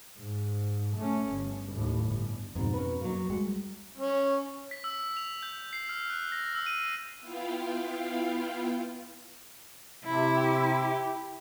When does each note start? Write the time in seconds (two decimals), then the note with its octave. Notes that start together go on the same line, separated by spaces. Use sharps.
0.18 G#2
0.97 A3 C#4
1.30 G1
1.73 D#2 A2
2.04 G1
2.55 F2 G#2 B2
2.73 C#4 F#4 B4
3.01 F#3 A#3
3.30 G3 G#3 F#5
3.97 C#4
4.71 B6
4.84 E6
5.17 F7
5.43 G6
5.73 C7
5.89 F6
6.10 F#6
6.32 A#6
6.55 E6
6.66 D#7
7.21 B3 E4 F4 F5 G5
10.04 C3 E4
10.37 G4